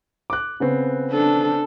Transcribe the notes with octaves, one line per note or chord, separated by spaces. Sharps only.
D6 F#6
C#3 B3 C4
D4 A4